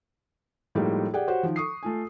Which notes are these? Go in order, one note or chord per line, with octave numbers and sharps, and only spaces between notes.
A2 F3 G3 G#3 A#3 D#4
G4 G#4 D5 F#5 G5
F#4 G4 C5 C#5 F#5
D#3 F3
C#6 D#6 C7
A3 F4 G#5